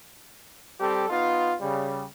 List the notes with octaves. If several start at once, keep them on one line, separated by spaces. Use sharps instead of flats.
G3 C4 G4 A4
B3 D#4 F4
C#3 G3